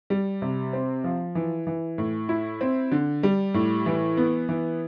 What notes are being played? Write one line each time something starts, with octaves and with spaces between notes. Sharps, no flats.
G3
C3
C4
F3
E3
E3
A2
E4
C4
D3
G3
A2
E3
B3
E3